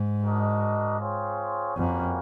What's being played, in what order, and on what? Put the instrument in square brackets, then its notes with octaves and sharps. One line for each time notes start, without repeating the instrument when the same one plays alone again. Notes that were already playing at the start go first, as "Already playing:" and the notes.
Already playing: [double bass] G#2
[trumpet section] D4 F#4 A#4 D#5
C4 F4 G#4 C#5
[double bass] F2 [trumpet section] G3 A#3 C#4 F#4 A#4